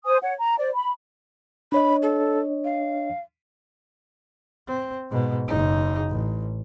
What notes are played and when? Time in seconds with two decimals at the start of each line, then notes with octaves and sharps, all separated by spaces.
0.05 C5 G#5 D#6
0.22 C#5 F#5
0.39 A#5
0.59 C5 D5
0.73 B5
1.72 D4 C#5 D#5 B5
2.02 A4
2.64 F5
4.67 C4
5.10 G#2 B2
5.48 F#1 D#4
6.10 A1